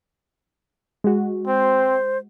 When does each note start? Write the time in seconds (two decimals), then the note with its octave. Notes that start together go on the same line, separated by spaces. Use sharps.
1.04 G#3 F#4
1.47 C4 C5